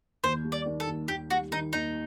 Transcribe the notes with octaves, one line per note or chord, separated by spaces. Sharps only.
D#2 C5
G3
D5
D#3
A4
D#2
D#2 G4
G3 F#4
D#3 D#4
D#2 D#4